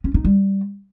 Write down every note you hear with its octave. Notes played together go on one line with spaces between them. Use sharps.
C#4
D#4
G3